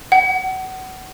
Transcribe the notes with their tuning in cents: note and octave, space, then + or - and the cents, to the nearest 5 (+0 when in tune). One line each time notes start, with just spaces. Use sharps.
F#5 +25